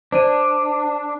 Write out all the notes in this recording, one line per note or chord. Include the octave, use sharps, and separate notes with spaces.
D4 C5 D5 D#7